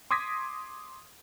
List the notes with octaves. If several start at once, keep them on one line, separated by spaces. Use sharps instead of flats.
C6 D6 D#6 G#6 A#6 B6